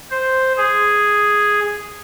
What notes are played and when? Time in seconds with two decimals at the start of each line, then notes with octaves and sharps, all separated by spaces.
0.11 C5
0.57 G#4